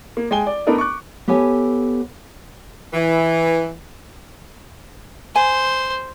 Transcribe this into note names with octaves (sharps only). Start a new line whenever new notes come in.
A#3
G#3 G5 G#5 G7
D5
A3 B3 D4 D#4 A#4 D5
C#6 D6 F#6
B3 G4 A4 C#5 G#5
E3
C5 G#5